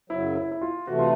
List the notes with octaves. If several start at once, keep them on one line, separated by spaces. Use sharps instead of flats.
F#2 C#3 F#3 E4
E4
E4
F4
C3 E3 A3 F#4
F4